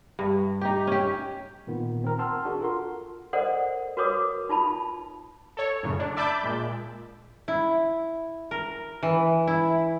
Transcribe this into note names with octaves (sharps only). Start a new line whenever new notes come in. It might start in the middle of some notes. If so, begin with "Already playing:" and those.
G2
D#4 G4
C#4 G4
A#2 D#3 B3
C4 A#4
F#5 G5 A5 C6 E6 F6
D4 F#4 G#4 A#4
F4 A4 A#4 F#5 C6
A4 A#4 C5 D5 D#5 F#5
F#4 A#4 B4 C#5 D6 D#6
D#4 F4 A5 B5
A4 C#5
F#2 A2 C#3
D4
D5 E5 A5 B5 D6 G6
A#2 G#3
E4
A#4
E3
E4